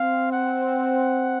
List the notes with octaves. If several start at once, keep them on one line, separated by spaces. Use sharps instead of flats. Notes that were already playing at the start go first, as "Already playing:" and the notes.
Already playing: C4 F5
F#5